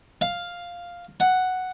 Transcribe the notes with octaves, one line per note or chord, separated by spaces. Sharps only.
F5
F#5